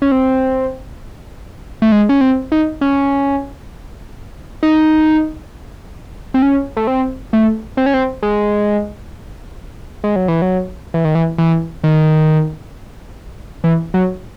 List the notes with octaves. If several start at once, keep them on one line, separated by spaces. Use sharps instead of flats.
C#4
C4
A3
G#3
C#4
C4
D#4
C#4
D#4
C4
C#4
A3
C4
A3
C4
C#4
C4
G#3
G#3
F#3
E3
F#3
E3
D#3
E3
E3
D#3
E3
F#3